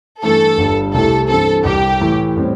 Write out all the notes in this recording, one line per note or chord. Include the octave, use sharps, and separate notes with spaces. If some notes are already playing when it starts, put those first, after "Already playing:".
G2 E3 A3 E4 A4
G1 G2 G3
C2 C3 A3 E4 G4 A4
G2 E3 C4 A4
C2 C3 G3 G4
A2 E3 A3 E4
A2 G3 C4